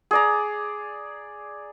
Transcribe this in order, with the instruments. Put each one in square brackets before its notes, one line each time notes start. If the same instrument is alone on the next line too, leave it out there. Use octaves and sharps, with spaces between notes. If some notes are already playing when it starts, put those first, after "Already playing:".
[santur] G#4 D5 A#5